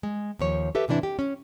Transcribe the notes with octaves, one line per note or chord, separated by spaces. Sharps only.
G#3
D#2 F3 C#5
G4 A4 B4 E5
G#2 C3 E3 D4 E4
G4
C#4